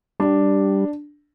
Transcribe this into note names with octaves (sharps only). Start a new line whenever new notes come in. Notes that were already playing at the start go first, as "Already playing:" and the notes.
G3 D4